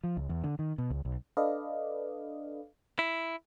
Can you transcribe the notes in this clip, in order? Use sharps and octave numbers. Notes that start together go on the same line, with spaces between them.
F3
C#2
E2
D3
D#3
B2
C#2
B1
D4 A4 B4 D5 D#5 F5
E4